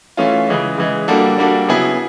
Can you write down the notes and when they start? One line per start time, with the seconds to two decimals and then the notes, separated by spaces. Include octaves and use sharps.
0.17 E3 A3 C#4 F4
0.47 C#3 E3 G#3
0.78 C#3 E3 G#3
1.08 G3 A#3 D4 F#4 A4
1.38 G3 A#3 D4 F#4 A4
1.68 C#3 F#3 B3 E4 G#4